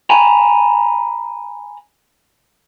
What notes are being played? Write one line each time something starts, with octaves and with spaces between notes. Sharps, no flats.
G#5 A#5 B5